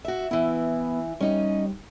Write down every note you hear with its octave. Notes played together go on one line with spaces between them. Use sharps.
F#4 E5
E3 B3 E4
G3 C#4 D#4 D#5